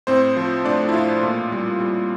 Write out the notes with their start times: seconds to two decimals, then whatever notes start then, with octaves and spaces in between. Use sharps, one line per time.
0.07 A2 C4 C5
0.37 F3
0.65 A3 D4 D5
0.89 E4
0.94 A2 F4
1.23 A#2
1.52 G3
1.80 G3